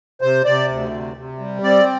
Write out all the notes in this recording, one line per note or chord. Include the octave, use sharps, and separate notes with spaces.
C3 C5
C3 D5
D2
C3
C3
G3
C4 D5